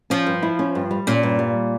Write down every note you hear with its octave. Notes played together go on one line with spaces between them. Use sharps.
F3 C#4
G2
E4
C#4
G2
G3
A#2 C#4
G2
G3